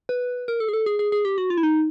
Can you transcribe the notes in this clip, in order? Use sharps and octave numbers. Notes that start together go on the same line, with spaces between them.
B4
A#4
A4
G#4
A4
G#4
G#4
G#4
G4
F#4
F4
E4
D#4